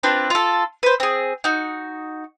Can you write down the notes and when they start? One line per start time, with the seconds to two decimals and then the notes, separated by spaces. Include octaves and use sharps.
0.03 C4 D4 F4 B4
0.30 F4 A4
0.83 B4 C5
1.00 C4 G#4
1.44 D#4 F#4